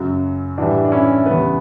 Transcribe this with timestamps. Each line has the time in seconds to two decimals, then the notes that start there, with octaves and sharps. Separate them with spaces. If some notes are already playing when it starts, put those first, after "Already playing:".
Already playing: F#2 C#3 F#3
0.58 A2 E3 G3 D4 F#4
0.84 D4
0.92 C#4 E4
1.26 E2 C#3 G3 B3